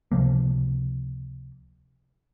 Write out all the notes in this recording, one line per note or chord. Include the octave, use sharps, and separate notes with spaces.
C#2 C3 F3 A#3